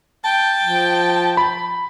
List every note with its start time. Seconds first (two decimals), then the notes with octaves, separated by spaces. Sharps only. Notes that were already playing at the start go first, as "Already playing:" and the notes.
0.24 G5 A5
0.61 F3
1.37 B5